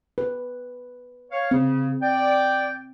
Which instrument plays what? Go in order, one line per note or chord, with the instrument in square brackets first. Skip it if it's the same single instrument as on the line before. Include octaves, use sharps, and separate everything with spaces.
[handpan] B4
[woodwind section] C#5 F5
[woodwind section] C#3 [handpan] C4
[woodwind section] D5 G5